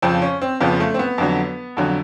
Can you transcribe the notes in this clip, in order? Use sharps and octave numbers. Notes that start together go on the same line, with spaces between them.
F2 C#3 F3 C4
C#4
C4
F2 C#3 F3 B3
A3
C4
B3
F2 D3 F#3
F2 D3 F#3